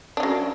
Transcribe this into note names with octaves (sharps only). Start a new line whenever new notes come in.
F#3 C#4 D4